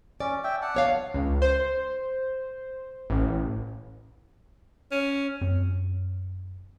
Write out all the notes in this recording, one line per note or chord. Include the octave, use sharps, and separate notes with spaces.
C#4 D5
E5 G5
D5 F#5 A5
B3 C#5 F5
C#2
C5
A1
C#4
F#2 C4